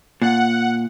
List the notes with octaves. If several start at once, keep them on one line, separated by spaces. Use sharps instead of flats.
A#2 F#5